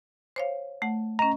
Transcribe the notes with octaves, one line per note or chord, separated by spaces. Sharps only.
C5 C#5 F5
A3 F#5
C#4 D#5 A#5